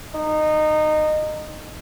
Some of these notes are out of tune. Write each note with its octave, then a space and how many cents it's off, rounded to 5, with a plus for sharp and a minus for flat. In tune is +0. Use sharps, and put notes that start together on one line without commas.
D#4 -20